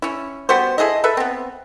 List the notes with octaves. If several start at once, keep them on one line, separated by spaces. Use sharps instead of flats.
C#4 E4
G3 B3 F#4 C5
E4 G#4 A4 D#5
A4 B4 E5
B3 C4